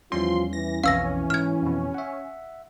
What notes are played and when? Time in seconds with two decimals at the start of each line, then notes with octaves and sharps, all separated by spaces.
0.12 E2 E3 F3 G3 C#4 F4 C6
0.53 E3 A#6
0.84 B1 F2 B2 E3 C#4 F5 E6 A#6
1.30 G#2 F6 G#6
1.62 F2 B2
1.94 E5 F#5